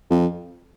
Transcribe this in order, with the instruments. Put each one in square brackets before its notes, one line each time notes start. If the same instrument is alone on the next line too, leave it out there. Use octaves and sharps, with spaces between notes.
[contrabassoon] F2